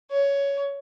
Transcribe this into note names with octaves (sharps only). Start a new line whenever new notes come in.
C#5